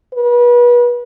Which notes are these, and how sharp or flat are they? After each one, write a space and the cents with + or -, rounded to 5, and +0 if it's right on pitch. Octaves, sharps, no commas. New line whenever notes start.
B4 -35